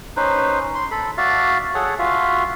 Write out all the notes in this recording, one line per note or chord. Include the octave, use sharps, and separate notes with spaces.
C#4 D#4 B4 C5
C6
A4 B5
F#4 D5 E5 F5
G#4 A4 C#5 F#5
F4 F#4 E5 F5